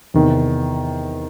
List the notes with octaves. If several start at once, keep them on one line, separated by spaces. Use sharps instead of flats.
E2 C3 D#3